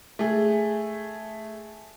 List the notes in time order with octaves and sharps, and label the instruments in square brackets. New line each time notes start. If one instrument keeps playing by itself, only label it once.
[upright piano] A3 G#4